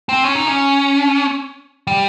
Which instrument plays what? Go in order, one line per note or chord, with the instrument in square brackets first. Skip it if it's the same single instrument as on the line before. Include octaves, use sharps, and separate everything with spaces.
[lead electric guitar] C4
C#4
D#4
C#4
G3